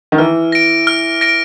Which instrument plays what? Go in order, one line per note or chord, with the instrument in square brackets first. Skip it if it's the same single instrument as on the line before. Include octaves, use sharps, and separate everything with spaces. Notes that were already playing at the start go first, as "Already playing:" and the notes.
[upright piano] D#3
[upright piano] E3 [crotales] F6
[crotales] A#6 D7
F6
A#6 D7